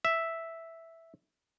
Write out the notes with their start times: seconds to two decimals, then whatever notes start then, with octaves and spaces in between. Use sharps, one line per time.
0.05 E5